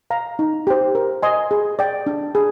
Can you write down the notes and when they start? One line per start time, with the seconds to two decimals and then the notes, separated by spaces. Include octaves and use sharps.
0.10 F5 A#5
0.39 D#4
0.67 G4 C5
0.95 A#4
1.23 D#5 G#5 C6
1.51 G#4
1.79 D5 G5
2.06 D4
2.35 G#4